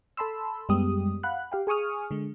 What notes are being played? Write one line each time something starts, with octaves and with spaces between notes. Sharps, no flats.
A4 A5 B5 C6 E6
F#2 G3 G#3 B3 G4 D#6
F5 F#5 B5 F#6
G4 F5 G5
G#4 G#5 C#6 D#6 F6
D3 G#3